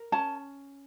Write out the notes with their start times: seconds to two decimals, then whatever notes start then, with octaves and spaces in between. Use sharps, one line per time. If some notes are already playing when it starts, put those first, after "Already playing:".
Already playing: A#4
0.12 C#4 A5